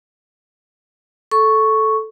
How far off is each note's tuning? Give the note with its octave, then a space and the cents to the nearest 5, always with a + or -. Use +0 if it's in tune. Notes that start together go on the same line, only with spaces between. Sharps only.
A4 -10 C#6 +0